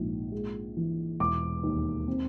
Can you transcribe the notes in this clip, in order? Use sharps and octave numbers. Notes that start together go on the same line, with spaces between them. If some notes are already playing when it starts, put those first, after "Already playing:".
Already playing: A#1 G#2
G#3
E3
E1 D6
D#2
C4